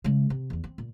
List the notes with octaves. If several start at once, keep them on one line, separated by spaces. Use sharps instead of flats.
C#3 G#3
C3
E1 E2
C4
A#2